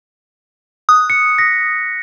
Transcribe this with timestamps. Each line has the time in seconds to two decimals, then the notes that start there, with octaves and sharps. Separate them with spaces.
0.89 D#6 F#6
1.10 C#7
1.38 A#6 B6